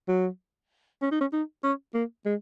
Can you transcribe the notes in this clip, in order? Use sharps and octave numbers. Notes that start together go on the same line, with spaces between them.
F#3
C#4
D#4
C#4
D#4
C#4
A#3
G#3